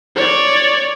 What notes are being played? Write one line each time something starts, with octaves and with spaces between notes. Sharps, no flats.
C#5 D5